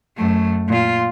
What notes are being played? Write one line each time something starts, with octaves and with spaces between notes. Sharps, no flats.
F#2 A3
A#2 F4